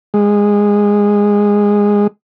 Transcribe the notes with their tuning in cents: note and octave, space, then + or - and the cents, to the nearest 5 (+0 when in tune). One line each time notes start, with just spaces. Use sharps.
G#3 -15